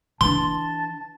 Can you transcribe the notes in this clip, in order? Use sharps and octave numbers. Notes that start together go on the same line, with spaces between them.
E3 D4 A5 C6